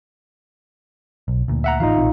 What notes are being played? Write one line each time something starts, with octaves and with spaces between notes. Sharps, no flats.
B1
D2 A#2
E5 F#5 A#5
A1 E3 D#4 F4 F5
A#1 C4